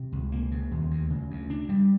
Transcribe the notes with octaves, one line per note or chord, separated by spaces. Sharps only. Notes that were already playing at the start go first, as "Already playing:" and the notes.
Already playing: C3
C#2
A#3
C#3
D#2
D2
C#3
D2
D4
G3